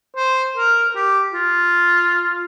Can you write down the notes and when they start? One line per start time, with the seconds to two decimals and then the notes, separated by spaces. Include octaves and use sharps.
0.16 C5
0.56 A#4
0.96 G4
1.34 F4